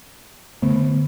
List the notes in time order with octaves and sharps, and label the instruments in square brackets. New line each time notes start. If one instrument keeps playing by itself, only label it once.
[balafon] D3 [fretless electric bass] A3 B3